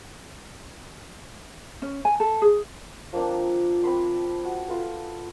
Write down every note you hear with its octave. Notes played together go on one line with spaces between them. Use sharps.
C#4
G#5
A4
G#4
F3 A#3 C4 D4
C4 B5 C6
F#4
F4 A4 B4